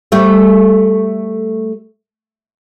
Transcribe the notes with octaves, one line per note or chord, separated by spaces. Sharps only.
G3 A3